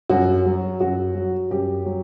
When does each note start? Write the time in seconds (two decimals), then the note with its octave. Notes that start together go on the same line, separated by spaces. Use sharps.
0.09 F#2 F#4
0.46 F#3
0.80 F#2 F#4
1.15 F#3
1.51 F#2 G4
1.86 F#3